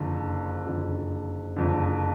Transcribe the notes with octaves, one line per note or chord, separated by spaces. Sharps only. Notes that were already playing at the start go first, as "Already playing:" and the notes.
Already playing: F#1 F2 D3
F#1 F2 D3
F#1 F2 D3